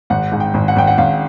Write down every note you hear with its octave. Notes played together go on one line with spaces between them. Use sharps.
G#1 F#5
G#2
G5
G#1
F#5
G#1 G5
F#5
G#1 F5